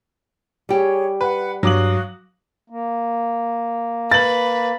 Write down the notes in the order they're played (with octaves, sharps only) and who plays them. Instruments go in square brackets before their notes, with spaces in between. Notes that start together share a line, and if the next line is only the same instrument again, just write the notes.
[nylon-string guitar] G3 G4 [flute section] G#4 C#5
[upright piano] B4 [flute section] F#5
[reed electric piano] G2 [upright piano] F#3 D6 F#7 [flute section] F#4 F5 D#6
[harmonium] A#3
[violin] B4 [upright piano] A6 F#7